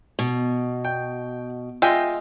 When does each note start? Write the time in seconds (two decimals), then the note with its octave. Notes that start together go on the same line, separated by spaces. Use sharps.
0.19 B2
0.85 G5
1.82 G#3 F4 E5 G5